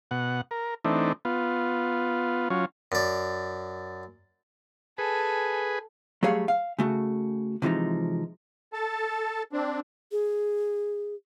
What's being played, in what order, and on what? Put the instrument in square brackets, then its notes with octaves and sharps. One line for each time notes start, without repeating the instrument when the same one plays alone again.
[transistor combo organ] B2 F#5
A#4
E3 A3 C4 D4 D#4
B3 F4
F#3 C#4 F4
[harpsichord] F#2 D5
[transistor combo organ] G#4 B4 [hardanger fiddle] A4 G#5
[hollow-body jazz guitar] F#3 G3 A3 G#4 C#5 F5
F5
C#3 A3 F#4
C3 E3 F3 G#3 D#4
[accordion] A4 A5
C4 D4
[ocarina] G#4